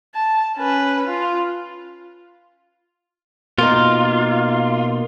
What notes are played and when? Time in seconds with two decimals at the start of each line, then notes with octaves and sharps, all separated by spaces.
0.15 A5
0.57 C#4 B4
1.07 F4
3.58 B2 A#3 D#4 F4